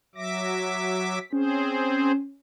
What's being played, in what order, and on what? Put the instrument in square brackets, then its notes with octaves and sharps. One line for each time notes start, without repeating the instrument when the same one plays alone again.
[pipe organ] F#3 E5 D6 [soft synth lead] A#6
[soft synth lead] B6
[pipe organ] C4 G#4 C5 [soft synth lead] C#4